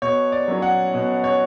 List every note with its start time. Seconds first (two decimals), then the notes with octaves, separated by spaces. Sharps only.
0.02 B2 C#5
0.32 D5
0.48 F#3 C#4
0.62 F#5
0.94 B2
1.24 C#5